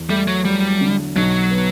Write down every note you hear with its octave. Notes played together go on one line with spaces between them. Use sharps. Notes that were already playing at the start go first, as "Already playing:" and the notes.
Already playing: E2
G3 A3
F#3
F#3 G3
D3
B1 F#3
B3